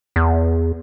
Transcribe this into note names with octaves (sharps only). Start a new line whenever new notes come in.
E2